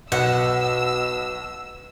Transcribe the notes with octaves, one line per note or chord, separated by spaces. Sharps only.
B1 B2 F#5 E6